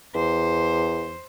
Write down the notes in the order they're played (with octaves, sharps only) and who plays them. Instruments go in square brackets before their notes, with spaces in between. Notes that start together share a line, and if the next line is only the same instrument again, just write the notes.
[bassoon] E2 [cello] C5